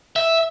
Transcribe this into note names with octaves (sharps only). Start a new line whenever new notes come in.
E5